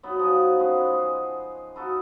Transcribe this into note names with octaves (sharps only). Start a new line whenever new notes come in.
F#3 B3 D#4
F3 F#3 F#4 G#5
G#3 C#4 B4 D#5
C5
D#4 F#4 A4 B4